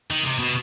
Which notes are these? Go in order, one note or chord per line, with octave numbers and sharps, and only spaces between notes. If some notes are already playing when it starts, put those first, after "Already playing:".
D#3
C3
B2